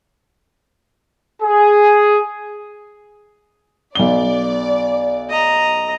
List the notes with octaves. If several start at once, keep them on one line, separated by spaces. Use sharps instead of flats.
G#4
B1 D5 G7
D#5 A#5